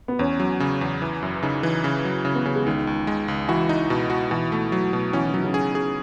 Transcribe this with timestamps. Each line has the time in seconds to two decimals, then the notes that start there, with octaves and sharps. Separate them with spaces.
0.08 B3
0.19 E2 C#4
0.40 F#3
0.60 C#3
0.81 E2
1.02 E3
1.23 F#2
1.43 C#3 D#4
1.63 E3
1.84 C#3
2.05 F#3
2.25 C#3
2.35 B3
2.45 C#3
2.56 G#3
2.66 C#2 D#3
2.87 C#2
3.07 G#3
3.28 C#2
3.49 E3 F#4
3.69 D#4
3.90 B2
4.10 F#4
4.31 B2 E3
4.52 A3
4.72 F#3
4.93 B2
5.13 E3 C#4
5.24 D#3
5.34 D#3 F#3
5.44 C#3
5.54 C#3 G#4
5.75 G#4